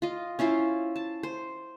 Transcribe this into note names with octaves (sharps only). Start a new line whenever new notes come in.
F4 D#5
C#4 E4 F4 C5
A5
C5